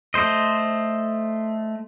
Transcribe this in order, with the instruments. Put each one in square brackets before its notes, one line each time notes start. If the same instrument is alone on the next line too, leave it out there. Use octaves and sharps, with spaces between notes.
[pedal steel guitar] A3 C5 D#5